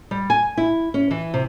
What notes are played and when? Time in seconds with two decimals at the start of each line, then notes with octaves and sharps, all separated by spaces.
0.11 G3
0.30 G#5
0.57 E4
0.94 C#4
1.11 E3
1.34 C3